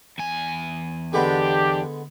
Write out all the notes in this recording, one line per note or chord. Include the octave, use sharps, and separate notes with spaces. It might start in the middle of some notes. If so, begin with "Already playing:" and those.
E2 G#5
D3 G#3 B3 D4 G4